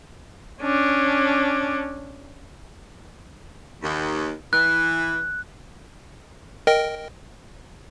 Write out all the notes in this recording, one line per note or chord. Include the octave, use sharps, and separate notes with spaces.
C#4 D4
D#2
E3 F#6
A#4 D#5 G5